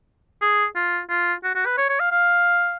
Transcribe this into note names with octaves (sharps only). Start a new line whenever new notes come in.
G#4
F4
F4
F#4
F#4
B4
C#5
C#5
F5
F5